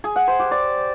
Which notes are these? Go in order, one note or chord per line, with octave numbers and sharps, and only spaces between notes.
G#4
F#5
C5
G4
D5